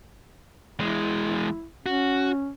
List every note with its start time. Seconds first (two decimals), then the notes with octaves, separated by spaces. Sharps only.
0.79 E2 G#3 E4
1.86 C#4 F#4